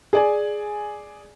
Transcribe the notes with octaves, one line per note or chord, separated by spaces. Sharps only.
G#4 D5 G#5